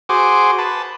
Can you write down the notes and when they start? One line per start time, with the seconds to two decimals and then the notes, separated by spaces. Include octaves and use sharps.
0.09 F#4 G#4 C5 D6
0.58 B4 A5